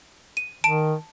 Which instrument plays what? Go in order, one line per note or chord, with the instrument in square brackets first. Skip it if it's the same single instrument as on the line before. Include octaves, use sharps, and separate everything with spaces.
[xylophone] D#7
[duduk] D#3 [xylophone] A5 D7